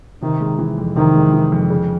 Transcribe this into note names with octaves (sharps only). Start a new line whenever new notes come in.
C3 D#3
G#3
E3
F2
C3 D#3
G#3
E3
F2
C#3